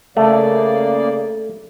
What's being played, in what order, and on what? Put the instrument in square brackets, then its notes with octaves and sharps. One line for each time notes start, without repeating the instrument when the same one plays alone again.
[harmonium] C#3 A#3 D5 [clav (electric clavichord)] A3